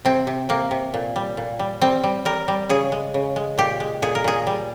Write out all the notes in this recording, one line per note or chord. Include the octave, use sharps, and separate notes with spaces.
C3 C4
C3
C3 A#3
C3
A#2
G3
A#2
G3
G3 C4
G3
G3 A#4
G3
C#3 G#4
G#3
C#3
G#3
A#2 G4
G#3
A#2 G#4
A#4
A#2 G#4
G3